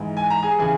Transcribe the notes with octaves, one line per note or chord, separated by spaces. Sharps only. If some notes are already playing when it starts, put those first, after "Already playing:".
Already playing: G#2 E3
G#5
A#5
G#4 G#5
C#3 E3 G#4 G#5